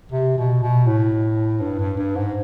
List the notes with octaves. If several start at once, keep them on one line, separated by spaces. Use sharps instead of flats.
C3
B2
B2
A2
G2
G2
G2
G#2